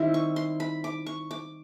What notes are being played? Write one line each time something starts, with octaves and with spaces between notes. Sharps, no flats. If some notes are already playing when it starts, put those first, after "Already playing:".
Already playing: D#3 G3 C4 E4
C#6
C6
B5
D6
C#6
D6